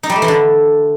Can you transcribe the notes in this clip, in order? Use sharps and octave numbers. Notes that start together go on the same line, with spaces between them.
D#4
G3
A3
E3
D3